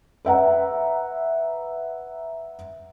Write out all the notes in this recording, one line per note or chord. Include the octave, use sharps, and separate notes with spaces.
B4 E5 F#5 A#5